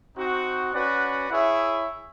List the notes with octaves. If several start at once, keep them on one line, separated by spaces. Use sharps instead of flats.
C4 D#4 F#4
C#4 F#4 B4 D5 F#5
E4 G#4 C#5 E5